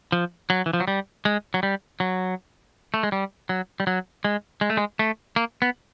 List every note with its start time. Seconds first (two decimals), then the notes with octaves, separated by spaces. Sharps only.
0.12 F3
0.50 F#3
0.66 E3
0.73 F3
0.80 F#3
0.88 G3
1.25 G#3
1.54 F#3
1.63 G3
2.00 F#3
2.94 A3
3.03 G#3
3.12 G3
3.49 F#3
3.80 G3
3.87 F#3
4.25 G#3
4.61 G#3
4.70 A3
4.77 G#3
4.99 A3
5.36 A#3
5.62 B3